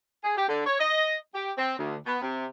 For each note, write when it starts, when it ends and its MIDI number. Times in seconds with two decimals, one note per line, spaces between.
0.24 0.36 68
0.37 0.47 67
0.48 0.65 50
0.65 0.78 73
0.80 1.15 75
1.34 1.51 67
1.58 1.77 60
1.78 1.95 38
2.06 2.19 59
2.22 2.46 48